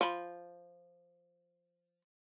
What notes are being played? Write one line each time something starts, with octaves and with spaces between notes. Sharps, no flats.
F3 B5